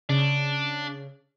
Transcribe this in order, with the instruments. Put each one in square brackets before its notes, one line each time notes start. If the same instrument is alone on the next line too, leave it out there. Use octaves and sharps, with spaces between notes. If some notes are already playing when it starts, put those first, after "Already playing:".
[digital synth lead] C#3 [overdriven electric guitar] D4